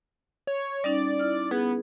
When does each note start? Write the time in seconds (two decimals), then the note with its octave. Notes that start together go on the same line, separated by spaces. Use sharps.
0.47 C#5
0.84 G3 C#4 D#4 D5
1.19 E4 F6
1.51 B3 G#4